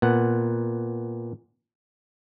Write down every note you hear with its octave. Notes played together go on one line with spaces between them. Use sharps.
A#2 B3 F#5